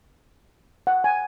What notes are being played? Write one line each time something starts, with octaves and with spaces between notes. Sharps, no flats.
F#5
G#5